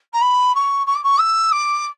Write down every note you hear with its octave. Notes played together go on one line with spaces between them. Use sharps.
A#5
B5
C#6
C#6
D6
C#6
E6
D6